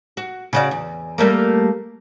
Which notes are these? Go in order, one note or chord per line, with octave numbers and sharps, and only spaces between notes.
F#4
C#3 F#4 D5
E2
G3 A3 A#3